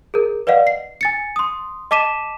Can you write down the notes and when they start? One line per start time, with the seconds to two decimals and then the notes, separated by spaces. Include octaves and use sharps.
0.14 G#4 A#4
0.47 B4 D5 D#5 F5 F#5
0.67 C7
1.01 G#5 A6 C#7
1.36 C6 D#6
1.91 D#5 A5 D6 B6 D#7 E7